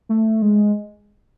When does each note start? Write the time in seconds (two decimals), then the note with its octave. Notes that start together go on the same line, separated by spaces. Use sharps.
0.09 A3
0.42 G#3